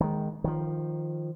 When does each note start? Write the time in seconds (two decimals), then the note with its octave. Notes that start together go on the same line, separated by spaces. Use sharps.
0.01 D#3 G#3
0.44 D#3 F3